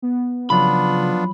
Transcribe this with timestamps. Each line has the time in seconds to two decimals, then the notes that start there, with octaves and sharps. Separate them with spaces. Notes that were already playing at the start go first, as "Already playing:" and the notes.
0.02 B3
0.50 C#3 F3 F#3 B3 D4 F4 B5